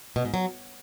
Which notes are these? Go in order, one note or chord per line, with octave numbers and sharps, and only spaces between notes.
B2
G#2
F#3